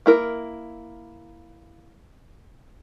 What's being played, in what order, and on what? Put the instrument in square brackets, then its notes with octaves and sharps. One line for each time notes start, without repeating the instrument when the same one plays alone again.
[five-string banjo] A#3 E4 A#4